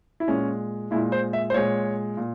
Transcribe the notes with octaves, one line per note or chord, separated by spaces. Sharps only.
E4
A#2 G#3 C#4
A#2 G#3 E4
C5
E5
C5
A#2 G#3 C#5
A#2